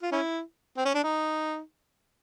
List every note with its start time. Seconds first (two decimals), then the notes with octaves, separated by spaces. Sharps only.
0.02 F4
0.12 C#4 E4
0.77 C4
0.86 C#4
0.95 D4
1.04 D#4